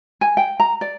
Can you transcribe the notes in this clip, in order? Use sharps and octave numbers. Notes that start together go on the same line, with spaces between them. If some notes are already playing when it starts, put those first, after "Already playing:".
G#5
G5
A#5
D5